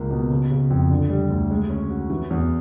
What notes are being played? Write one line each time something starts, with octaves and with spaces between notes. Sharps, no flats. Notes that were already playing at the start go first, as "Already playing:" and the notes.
Already playing: C#2 A#3
B2
C#3
C#3
F2
D3
G3
D2
G#3
C#4
F#4
E3
E2